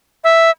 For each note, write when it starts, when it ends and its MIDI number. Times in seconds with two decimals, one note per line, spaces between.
0.24 0.50 76